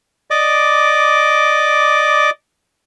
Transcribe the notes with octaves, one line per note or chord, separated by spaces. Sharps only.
D5 D#5 D6